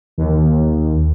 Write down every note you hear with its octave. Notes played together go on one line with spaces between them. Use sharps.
D#2